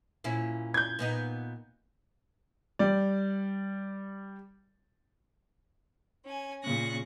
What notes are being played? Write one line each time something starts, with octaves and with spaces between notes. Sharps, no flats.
A#2 C#4 E4
G6 G#6
A#2 B3 D#4
G3 D5
C#4 G#5
A#2 C#3 C#6 F#6 A#6